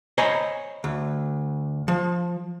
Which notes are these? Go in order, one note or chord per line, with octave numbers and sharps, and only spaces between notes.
C5 C#5 D#5 G#5 A#5 B5
D2
F3